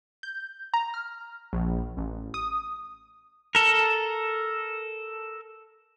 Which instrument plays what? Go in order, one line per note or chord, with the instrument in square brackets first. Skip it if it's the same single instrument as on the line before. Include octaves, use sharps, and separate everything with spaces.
[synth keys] G6
A#5
F6
A#1
A1
D#6
[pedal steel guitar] A4 A#4